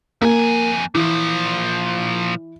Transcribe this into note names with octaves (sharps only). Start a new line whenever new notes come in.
F2 A#3 G#5
A#2 E3 F3